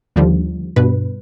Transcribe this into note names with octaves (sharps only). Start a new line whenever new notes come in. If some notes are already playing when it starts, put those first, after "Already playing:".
D#2 D3 F3 G3
G2 B2 B4